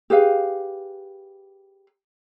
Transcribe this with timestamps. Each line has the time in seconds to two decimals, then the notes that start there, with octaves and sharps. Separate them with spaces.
0.10 G4 G#4 B4 F5